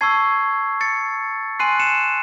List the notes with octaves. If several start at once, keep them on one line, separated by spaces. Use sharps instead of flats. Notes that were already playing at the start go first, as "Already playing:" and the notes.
A5 C#6 E6 G#6 C7
A6 C#7
G#5 C6 F#6 C7 D#7
C#7 E7